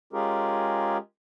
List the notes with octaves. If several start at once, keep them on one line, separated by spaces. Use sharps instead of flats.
G#3 C#4 F4 G4 G#4 A#4